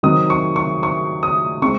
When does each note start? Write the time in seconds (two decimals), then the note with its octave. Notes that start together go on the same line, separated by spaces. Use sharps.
0.03 D#3 F#3 C4 D#6
0.30 C#6
0.56 C#6
0.83 C#6
1.23 D#6
1.62 G#3 C4 C#6